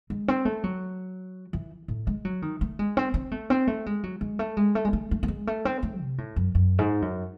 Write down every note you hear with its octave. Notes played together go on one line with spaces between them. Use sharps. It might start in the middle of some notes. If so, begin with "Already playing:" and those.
G#3
C4
A3
F#3
E3
A2
G#3
F#3
D#3
A3
G#3
C4
C4
A3
C4
A3
G#3
F#3
G#3
A3
G#3
A3
G#3
A3
A3
A3
G#3
A3
C4
A3
C3
A2
F#2
F#2
G#2
F#2